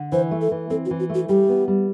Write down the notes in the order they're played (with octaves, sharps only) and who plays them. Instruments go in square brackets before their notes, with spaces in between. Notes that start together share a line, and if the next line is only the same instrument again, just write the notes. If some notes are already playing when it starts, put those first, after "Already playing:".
Already playing: [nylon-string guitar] D3
[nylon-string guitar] E3 [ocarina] C5
[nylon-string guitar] A3
[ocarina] A4
[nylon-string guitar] E3
[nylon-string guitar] C4 [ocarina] A4
[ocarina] F#4
[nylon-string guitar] E3
[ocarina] F#4
[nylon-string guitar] A3 [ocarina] F#4
[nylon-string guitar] G3 [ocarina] G4
[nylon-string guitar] B3
G3